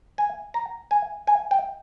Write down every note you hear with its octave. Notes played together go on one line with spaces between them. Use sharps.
G#5
A#5
G#5
G#5
G5